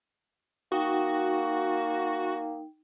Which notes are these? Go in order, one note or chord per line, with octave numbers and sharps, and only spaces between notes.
A#3 D#4 F#4 G5